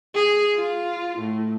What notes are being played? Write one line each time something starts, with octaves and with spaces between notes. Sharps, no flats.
G#4
F4
A2